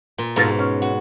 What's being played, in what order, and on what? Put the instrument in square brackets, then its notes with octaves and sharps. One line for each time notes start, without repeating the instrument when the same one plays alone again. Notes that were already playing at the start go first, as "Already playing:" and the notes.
[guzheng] A#2
[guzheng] G#2 B2 [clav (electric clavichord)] F4 A4 A#4
[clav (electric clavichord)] C#4
[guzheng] F#4